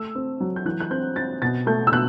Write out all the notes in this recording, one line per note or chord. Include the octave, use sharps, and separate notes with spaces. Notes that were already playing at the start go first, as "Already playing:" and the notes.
Already playing: A3 E6
C4
F#3
G6
E3 F#6
F#6
C4 G6
C4 A6
B2 A6
A3 G6
E6
B2 F#6